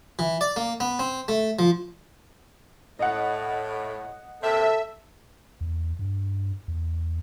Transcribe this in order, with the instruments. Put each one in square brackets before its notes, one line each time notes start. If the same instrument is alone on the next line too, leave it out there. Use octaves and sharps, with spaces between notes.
[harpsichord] E3
D5
A#3
B3
C4
A3
F3
[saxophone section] A2 [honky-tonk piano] D#5 F#5
[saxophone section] C3 A#3 C4 [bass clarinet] A4 [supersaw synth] E5
[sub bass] E2
G2
E2